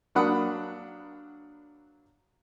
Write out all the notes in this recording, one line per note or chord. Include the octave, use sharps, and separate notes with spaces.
F#3 A#3 D4 F#5 B5 D#6